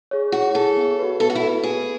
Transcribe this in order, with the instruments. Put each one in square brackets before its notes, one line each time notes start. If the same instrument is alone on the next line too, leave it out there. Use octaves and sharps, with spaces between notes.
[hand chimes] G#4 C#5
[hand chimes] E4 [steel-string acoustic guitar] F#4
[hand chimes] G#4 C#5 [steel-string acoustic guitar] A4
[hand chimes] B3
F#4 B4
[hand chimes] B3 [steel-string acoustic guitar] A4
[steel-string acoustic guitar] F#4
E4
[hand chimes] F#4 B4
[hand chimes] B3 [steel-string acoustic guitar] G#4